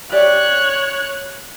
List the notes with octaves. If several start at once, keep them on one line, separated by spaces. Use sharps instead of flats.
G4 C#5 D5 E5 F#6